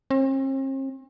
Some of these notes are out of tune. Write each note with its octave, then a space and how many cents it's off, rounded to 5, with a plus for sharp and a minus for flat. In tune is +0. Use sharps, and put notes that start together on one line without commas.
C4 +45